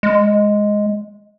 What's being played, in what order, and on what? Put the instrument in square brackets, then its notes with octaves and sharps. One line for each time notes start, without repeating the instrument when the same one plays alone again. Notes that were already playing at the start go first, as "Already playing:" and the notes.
[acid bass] G#3